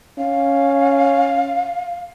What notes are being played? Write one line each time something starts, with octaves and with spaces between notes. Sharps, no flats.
C#4 F5